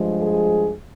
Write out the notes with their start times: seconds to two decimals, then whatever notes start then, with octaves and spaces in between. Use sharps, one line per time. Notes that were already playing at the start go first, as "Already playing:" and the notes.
Already playing: G2 F3 G#3
0.22 G#4